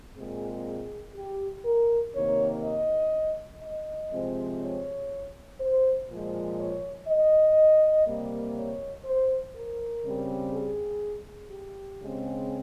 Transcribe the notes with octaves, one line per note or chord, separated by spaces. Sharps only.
A#2 G#3 C4 G#4
G#4
G4
A#4
C3 D#3 A#3 C#5
D#5
D#5
C3 F3 G#3 C4
C#5
C5
A#2 F3 G#3
C#5
D#5
C3 G3 A#3
C#5
C5
A#4
C#3 G3 C4
G#4
G4
C#3 G#3 C4